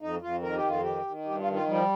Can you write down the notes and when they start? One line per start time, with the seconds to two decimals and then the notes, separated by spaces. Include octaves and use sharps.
0.01 F2 D#4
0.22 F2 F4
0.42 D#3 A#4
0.55 G4
0.63 F2 F4
0.82 D#3 G4
1.05 D#3
1.25 G2 G4
1.39 F4
1.46 D#3
1.54 F4
1.67 F3 G3